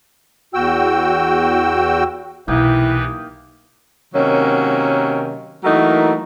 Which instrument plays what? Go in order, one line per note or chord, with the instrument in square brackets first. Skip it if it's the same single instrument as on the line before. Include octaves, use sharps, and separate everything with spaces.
[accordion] E2 F#4 G5 E6
[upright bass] B1 [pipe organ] C3 E3 B4 [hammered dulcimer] A#3 D#4 G5 [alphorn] E4
[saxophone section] C3 D#3 F#3 A#3 C#4
E3 F#3 A3 A#3 D#4 A#4